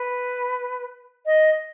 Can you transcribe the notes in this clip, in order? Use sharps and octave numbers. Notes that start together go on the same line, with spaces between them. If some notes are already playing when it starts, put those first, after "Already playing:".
Already playing: B4
D#5